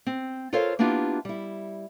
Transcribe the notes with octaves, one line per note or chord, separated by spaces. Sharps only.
C4
F4 A4 A#4 C5 C#5 F5
A#3 B3 D4 E4 F4 G4
G3 E4